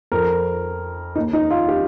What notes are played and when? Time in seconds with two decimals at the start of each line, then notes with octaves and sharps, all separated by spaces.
0.12 F2 F3 A#4
1.16 D#2 D#3 D#4
1.33 D#4
1.51 F4
1.69 G4